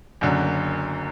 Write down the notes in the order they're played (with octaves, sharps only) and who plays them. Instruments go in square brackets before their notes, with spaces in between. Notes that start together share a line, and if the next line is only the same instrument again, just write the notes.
[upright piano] F#1 F#2 D3